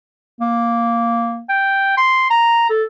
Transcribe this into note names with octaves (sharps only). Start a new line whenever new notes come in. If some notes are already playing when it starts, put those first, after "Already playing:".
A#3
G5
C6
A#5
A4